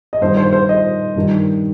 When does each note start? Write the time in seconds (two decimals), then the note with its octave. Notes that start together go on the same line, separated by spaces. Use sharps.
0.13 D#5
0.21 G2 D#3 C5
0.37 C5
0.53 C5
0.69 D#5
1.16 G2 D#3